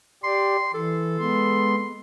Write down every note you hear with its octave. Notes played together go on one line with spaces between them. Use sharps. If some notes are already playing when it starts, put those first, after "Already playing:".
G4 D5 C6
E3 A4
G#3 B3 C6